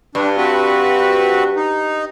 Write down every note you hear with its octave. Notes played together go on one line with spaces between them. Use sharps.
G2 D4
C4 F#4 B4
D#4